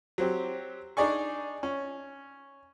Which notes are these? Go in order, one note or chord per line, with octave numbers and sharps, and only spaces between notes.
F#3 C4 G4
D4 D#4 G#4 D5 G#5 C#6
C#4